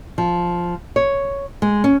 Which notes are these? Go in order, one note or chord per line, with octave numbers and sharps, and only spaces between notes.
F3
C#5
G#3
C#4